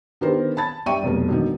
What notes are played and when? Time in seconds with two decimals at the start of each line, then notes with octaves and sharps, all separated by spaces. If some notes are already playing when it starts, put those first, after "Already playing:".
0.21 D3 D#3 B3 G4 A#4 C5
0.57 A5 B5 A6
0.86 G2 D5 E5 G5 C#6 D#7
1.03 F1 B1 A#3
1.29 E1 D3 D#3